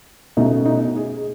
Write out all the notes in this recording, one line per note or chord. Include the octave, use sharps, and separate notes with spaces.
B2 A3 C#4 D#4
D#4
G#4